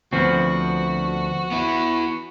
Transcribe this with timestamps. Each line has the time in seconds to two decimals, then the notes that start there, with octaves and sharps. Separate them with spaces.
0.13 D2 F3 B3 C4 F#4
1.51 B3 E4